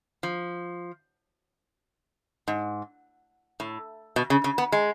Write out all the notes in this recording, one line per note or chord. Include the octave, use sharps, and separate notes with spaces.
F3
G#2
A2
B2
C#3
C#3
B3
G#3